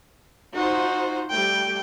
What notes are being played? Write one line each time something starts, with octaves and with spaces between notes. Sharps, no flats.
D#4 F4 F#4 C5
G3 A3 G5